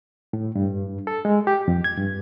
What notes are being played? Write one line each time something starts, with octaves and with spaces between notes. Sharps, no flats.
A2
G2
A4
G#3
G4
F2
G#6
G2